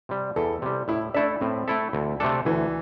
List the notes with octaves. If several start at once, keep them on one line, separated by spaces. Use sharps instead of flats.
C3 G3
E2 A4
C3 G3
A2 E4
A3 D4 E4 A4 E5
A2 C4
A3 E4 A4 E5
D2
C3 A3 D4 A4
D2 E3